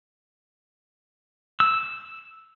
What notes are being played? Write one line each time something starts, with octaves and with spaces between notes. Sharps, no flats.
E6